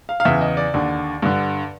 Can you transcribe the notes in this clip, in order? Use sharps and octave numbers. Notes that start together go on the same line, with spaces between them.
F5
F5
E2 C#3 E3 E5
D#5
D5
D#2 D3
G2 D3